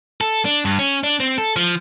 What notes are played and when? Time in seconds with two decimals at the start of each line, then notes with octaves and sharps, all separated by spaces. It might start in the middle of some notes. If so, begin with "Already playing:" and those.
0.21 A4
0.45 D4
0.65 G2
0.79 C#4
1.04 D4
1.20 C4
1.38 A4
1.56 F3